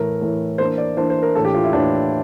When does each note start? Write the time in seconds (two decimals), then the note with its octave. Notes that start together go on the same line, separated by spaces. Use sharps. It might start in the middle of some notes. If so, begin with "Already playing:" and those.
Already playing: A2 E3 A3 A#4
0.21 A2 E3 A3
0.58 E3 A#3 D4 C5
0.78 D5
0.97 E3 A#3 D4 C5
1.10 C5
1.23 A#4
1.35 A2 E3 A#3 D4 A4
1.45 G4
1.54 F4
1.64 E4
1.73 A2 E3 A#3 D4